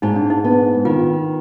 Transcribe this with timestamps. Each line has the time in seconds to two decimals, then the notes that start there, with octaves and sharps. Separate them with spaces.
0.02 G#2 D#4
0.16 D4
0.30 D#4
0.44 B3
0.85 D#3 F4